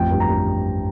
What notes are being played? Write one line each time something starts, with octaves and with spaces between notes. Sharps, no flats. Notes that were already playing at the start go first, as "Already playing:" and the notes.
Already playing: A1 F2 G5
G2
A#5
G2